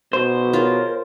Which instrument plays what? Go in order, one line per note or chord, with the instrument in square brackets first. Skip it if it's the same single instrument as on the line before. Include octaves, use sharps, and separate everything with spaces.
[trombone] B2 [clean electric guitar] C5
[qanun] F4 [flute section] G#4 A#4 C#5